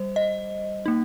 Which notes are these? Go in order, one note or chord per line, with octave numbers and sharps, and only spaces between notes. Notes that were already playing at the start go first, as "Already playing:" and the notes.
Already playing: G3 C5
D#5
A#3 D#4